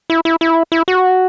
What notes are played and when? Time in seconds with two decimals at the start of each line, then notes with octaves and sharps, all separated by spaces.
0.10 E4
0.25 E4
0.41 E4
0.72 E4
0.88 F#4